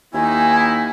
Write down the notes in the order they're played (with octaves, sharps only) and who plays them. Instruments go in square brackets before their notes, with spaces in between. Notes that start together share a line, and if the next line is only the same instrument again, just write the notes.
[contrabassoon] D#2 [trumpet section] A#3 D#4 E4 [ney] G#5